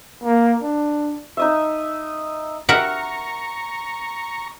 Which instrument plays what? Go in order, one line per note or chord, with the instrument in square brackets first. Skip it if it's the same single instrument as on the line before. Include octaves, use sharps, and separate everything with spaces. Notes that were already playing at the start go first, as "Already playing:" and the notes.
[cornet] A#3
D4
[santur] D#4 D#5 E5
[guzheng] A#4 E5 F#5 [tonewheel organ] A#5 C#6